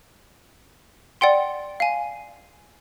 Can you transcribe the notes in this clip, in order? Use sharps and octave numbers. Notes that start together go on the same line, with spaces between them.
D5 F#5 G5 C6
F5 G#5